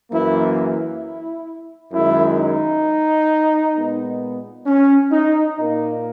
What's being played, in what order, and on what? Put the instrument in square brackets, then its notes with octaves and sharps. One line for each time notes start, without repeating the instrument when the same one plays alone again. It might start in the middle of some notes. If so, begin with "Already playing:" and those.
[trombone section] F#2 E3 A#3 E4
E4
F#2 D#3 G#3 E4
D#4
A#2 G#3 B3
C#4
D#4
A#2 A#3 D#4